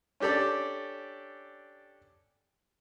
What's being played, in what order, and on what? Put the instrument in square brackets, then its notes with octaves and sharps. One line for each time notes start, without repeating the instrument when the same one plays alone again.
[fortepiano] C#4 D4 G4 A4 D5